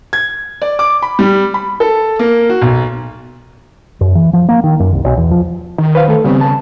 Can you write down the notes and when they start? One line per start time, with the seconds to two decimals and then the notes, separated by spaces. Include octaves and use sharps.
0.13 G#6
0.62 D5
0.79 D6
1.02 B5
1.19 G3
1.54 B5
1.80 A4
2.19 A#3
2.49 F#4
2.61 B1
4.01 F#2
4.15 E3
4.33 F3
4.49 A#3
4.64 D#3
4.80 F#2
4.93 C2
5.04 B1
5.17 E2
5.31 F3
5.78 D#3
5.95 B4 C5 F5
6.08 A3 A4
6.24 C#3 G3 B3 C4
6.41 A5